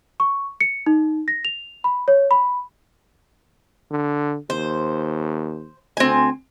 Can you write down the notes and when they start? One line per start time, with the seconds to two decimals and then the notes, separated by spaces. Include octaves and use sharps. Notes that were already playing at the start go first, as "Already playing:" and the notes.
0.20 C#6
0.61 C#7
0.86 D#4
1.28 A#6
1.45 F7
1.84 B5
2.08 C#5
2.31 B5
3.91 D3
4.50 D#2 C5
5.97 D2 C4 G#5